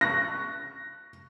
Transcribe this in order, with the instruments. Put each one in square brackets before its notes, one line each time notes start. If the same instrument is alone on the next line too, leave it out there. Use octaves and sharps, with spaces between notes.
[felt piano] C#6 F#6 A#6